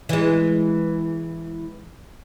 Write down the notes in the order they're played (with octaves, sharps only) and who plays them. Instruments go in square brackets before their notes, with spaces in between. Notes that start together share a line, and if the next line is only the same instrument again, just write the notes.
[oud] E3 G#3